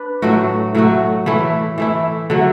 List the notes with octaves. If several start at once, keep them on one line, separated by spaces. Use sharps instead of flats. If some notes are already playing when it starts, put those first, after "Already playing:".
Already playing: D4 B4
A2 F#3 A3 F#4
A2 F#3 A3 F#4
E3 A3 E4
E3 A3 E4
D3 F#3 A3